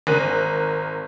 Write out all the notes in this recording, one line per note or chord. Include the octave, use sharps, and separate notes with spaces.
G#1 A#4 F#6 D#7